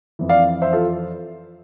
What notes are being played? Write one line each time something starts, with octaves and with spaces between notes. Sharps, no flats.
F2 E3
D5 F5
C5 E5
F4 A4